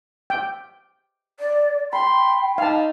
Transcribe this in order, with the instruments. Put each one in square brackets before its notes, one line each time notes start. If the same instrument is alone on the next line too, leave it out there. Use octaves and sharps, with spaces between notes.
[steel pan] G5
[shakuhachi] D5
[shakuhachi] G5 [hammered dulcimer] B5 [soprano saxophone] C6
[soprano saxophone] D#4 [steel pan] F5 A5